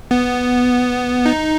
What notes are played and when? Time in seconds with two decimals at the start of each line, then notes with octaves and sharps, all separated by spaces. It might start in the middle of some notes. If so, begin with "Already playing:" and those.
0.11 B3
1.26 D#4